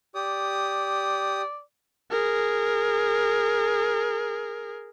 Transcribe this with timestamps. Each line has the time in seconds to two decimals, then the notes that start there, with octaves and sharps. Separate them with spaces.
0.15 G4 D5 D#6
2.10 G#4 A#4